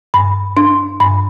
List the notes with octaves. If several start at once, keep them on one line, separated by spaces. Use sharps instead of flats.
G2 B5
D4 C6
G2 B5